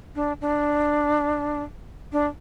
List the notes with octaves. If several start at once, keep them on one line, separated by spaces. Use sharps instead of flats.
D4
D4
D4